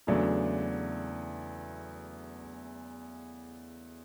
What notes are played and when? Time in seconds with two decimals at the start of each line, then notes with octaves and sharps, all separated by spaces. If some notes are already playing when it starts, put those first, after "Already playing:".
0.07 E2 C#3 F#3 A3 D4